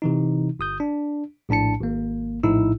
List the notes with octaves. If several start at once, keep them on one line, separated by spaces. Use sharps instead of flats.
C3 E3 D#4
G1 D#6 G6
D4
A#1 A2 D4 A5 C#7
G#1 A#3
A#1 A2 D#4 E4 E6